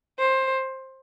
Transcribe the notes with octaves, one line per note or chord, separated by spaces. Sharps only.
C5